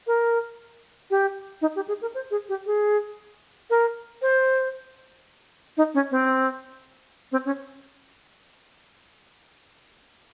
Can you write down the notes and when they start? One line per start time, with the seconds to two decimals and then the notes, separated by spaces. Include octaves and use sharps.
0.07 A#4
1.11 G4
1.62 D#4
1.76 G4
1.88 G#4
2.02 A#4
2.15 C5
2.31 G#4
2.49 G4
2.66 G#4
3.70 A#4
4.22 C5
5.77 D#4
5.94 C#4
6.11 C4
7.32 C4
7.46 C#4